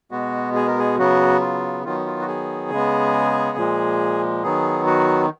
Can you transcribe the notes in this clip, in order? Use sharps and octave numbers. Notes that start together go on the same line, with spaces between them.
B2 G#3 B3 F#4
G#4
A#4
G#4
C#3 F#3 B3 F#4
F4
D#3 F#3 B3 F4
F4
F#4
G#4
C#3 G#3 B3
A#2 F3 G#3
D#3 F#3 B3 G#4
F#4